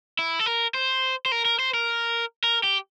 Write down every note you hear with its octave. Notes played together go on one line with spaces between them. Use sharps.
E4
A4
A#4
C5
C5
A#4
A#4
C5
A#4
A#4
G4